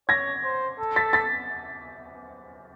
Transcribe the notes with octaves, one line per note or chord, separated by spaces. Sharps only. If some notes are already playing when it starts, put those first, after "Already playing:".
C#5 G#6 A#6
C5
A4
A6 B6
A6 B6